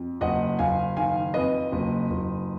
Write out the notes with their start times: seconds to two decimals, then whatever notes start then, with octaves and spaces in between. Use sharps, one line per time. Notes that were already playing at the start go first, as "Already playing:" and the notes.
Already playing: F2
0.21 F#1 D#5 F#5
0.59 F#1 F5 G#5
0.96 D#3 F5 G#5
1.34 F2 B4 D#5
1.72 F#1
2.10 F#1